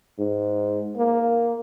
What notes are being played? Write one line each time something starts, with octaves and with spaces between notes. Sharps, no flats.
G#2
A#3